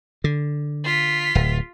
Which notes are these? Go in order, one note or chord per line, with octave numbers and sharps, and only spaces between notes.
D3
F4 B6
D1